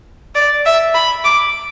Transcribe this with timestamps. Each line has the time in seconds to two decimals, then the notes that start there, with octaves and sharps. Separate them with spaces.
0.35 D5
0.66 E5
0.95 B5
1.24 D6